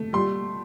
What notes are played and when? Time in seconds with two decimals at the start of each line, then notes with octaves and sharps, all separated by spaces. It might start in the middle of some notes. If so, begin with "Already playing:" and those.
Already playing: A3
0.13 G3 C6